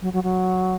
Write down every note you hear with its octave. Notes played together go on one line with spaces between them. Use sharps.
F#3
F#3
F#3